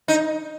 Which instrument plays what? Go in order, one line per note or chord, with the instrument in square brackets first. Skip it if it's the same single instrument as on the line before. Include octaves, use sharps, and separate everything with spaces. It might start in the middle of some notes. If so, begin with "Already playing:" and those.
[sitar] D#4